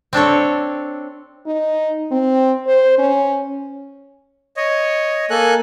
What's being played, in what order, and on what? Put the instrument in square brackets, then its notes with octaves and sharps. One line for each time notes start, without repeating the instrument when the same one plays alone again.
[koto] C4 D4 A4 C#5
[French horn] D#4
C4
C5
C#4
[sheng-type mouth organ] C#5 D#5
A#3 A4 G#5 F#6